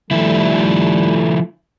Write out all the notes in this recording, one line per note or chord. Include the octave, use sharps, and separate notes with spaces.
D#3 F3 G3 A3 E4